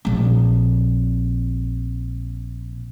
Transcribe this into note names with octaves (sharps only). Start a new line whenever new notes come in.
A#1 C4